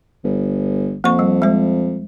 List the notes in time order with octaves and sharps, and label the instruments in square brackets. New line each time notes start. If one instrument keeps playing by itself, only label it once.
[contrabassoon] G1
[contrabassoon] F2 [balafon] A#3 C#6
[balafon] G3
G#3 C5